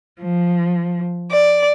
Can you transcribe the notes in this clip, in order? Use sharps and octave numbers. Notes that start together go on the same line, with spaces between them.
F3
D5